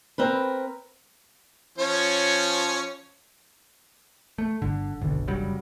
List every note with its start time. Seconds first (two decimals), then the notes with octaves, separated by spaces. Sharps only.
0.18 C4 A#4 B4
1.78 F3 C#4 C#5
4.38 A3
4.62 G1 D3
5.02 F#1 B1 D3
5.28 C#3 F#3 G3